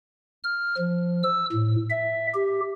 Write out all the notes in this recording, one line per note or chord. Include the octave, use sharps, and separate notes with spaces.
F6
F3
E6
A2
E5
G4